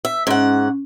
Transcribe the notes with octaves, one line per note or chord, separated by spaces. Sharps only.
E5
G#2 C#4 F#5